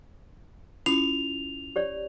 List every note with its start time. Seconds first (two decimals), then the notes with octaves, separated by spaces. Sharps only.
0.86 C#4 E4 F4 F7
1.76 G4 C#5 D5